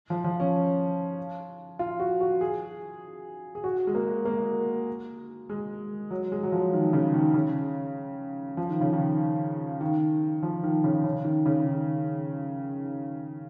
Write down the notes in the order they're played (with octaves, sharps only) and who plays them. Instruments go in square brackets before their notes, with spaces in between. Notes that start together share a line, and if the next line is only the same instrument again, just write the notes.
[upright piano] F3
F3
C#4
F4
F#4
F#4
G#4
G#4
F#4
G#3
A#3
A#3
G#3
F#3
G#3
F#3
F3
D#3
C#3
D#3
C#3
F3
D#3
C#3
D#3
D#3
F3
D#3
C#3
C#3
D#3
C#3
D#3